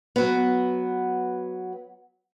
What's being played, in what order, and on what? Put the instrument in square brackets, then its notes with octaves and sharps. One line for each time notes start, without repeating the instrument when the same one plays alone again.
[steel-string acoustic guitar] F#3 B3